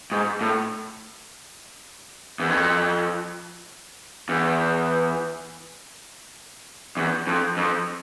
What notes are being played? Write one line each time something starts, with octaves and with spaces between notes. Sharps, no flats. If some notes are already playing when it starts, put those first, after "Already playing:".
G#2
A2
E2
F2
E2
E2
F2
F2